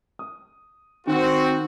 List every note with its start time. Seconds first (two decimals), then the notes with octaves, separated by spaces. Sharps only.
0.19 D#6
1.07 D#3 C4 F#4